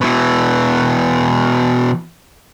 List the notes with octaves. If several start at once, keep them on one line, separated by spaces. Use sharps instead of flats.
B2 E3